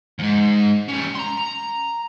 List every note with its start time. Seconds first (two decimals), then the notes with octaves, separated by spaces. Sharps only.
0.19 D#2 G#2
0.89 G3 C#4
1.15 A#5 C6